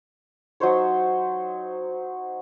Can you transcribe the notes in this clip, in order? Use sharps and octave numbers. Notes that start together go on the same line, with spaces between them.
F#3 D#4 C5 C#5